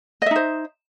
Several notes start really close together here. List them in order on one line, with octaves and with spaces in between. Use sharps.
D#5 E5 D#4 C5